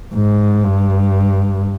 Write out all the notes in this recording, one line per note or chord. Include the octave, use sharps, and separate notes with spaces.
G#2
G2